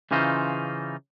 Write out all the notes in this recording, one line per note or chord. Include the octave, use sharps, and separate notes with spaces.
C#3 E3 C#4 D#4 F4 C5